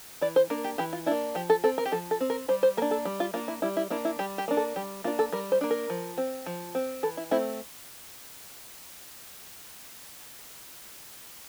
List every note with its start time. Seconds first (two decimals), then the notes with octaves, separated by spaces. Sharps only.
0.21 E3 D5
0.36 C5
0.50 A#3 D4 A#4
0.64 G4
0.78 E3 G4
0.93 F4
1.06 A#3 D4 E4
1.35 F3 G4
1.50 A4
1.64 C4 A4
1.78 A#4
1.85 G4
1.92 F3 A4
2.11 A4
2.21 C4
2.30 A#4
2.48 G3 C5
2.63 C5
2.77 A#3 A#4
2.82 D4
2.91 A4
3.05 G3
3.20 F4
3.34 A#3 D4 F4
3.48 E4
3.62 G3 E4
3.77 E4
3.90 A#3 D4 E4
4.05 E4
4.19 G3 G4
4.38 G4
4.48 A#3 D4
4.57 A4
4.76 G3 G4
5.04 A#3 D4 F4
5.19 A4
5.32 G3 A#4
5.52 C5
5.61 A#3 D4
5.71 A#4
5.90 F3
6.18 C4
6.46 F3
6.75 C4
7.03 E3 A4
7.17 E4
7.31 A3 C4 E4